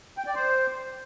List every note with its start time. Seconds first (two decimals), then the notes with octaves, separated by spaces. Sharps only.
0.18 G5
0.26 D5
0.35 C5